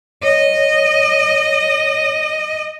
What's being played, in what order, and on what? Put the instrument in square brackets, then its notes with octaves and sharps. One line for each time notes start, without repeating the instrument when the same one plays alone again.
[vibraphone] C#5 [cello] D#5